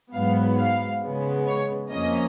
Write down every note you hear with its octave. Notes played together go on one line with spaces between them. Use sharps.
G#2 F#3 B3 F5
F5
C#3 G#3 B3
C#5
F2 F3 A#3 C#4 D#5